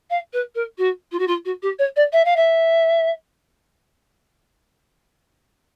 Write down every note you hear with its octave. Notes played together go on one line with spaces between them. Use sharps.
F5
B4
A#4
F#4
F4
F#4
F4
F#4
G4
C#5
D5
E5
F5
E5